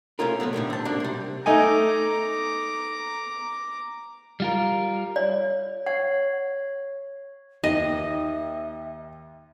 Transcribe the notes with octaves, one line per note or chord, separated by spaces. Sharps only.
C3 A3 C#4 F4 A#4
A#2 F3 A3 B3
A2 D3 D#3 G3
C4 A5
C#2 F#2 A#3 D4
C3 G3
A3 D#4 G#5 A#5 D6
G3 F4 A#4
C#5 D5
C#5 F#5
D#2 D#5 E5